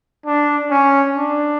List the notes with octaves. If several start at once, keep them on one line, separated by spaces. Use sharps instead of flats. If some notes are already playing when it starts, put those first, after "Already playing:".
D4
C#4
D4